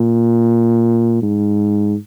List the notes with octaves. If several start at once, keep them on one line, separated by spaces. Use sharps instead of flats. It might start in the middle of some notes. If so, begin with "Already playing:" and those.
Already playing: A#2
G#2